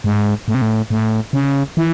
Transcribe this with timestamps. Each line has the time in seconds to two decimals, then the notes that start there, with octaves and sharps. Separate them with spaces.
0.04 G#2
0.48 A2
0.55 C3
0.62 A2
0.90 A2
1.33 C#3
1.77 E3